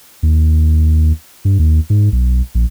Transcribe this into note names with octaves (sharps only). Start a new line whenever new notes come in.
D#2
G2
D#2
G#2
B1
A#1